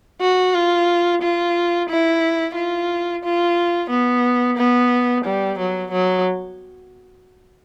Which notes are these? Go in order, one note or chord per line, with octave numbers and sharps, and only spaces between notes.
F#4
F4
F4
E4
F4
F4
B3
B3
G3
F#3
F#3